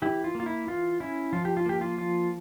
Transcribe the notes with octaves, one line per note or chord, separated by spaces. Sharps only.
E3 E4 G4
F4
A#3
F4
E4
E3 F4
C#4 E4
F3 F4
G4
F4
A#3 G4
F4
F3 F4